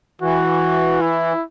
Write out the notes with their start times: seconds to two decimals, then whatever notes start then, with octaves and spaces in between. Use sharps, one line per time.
0.21 E3 F#4
1.01 E4